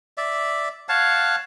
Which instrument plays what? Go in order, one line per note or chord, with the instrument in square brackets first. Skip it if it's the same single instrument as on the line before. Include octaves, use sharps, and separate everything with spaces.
[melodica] D5 E5
C#5 F5 F#5 A5